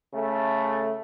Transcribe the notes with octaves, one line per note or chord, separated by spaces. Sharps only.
C#3 A3